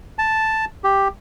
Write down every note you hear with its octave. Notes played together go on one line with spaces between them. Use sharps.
A5
G4